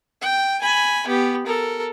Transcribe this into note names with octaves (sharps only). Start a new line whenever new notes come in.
G5
G#5 B5
B3 G4
A4 A#4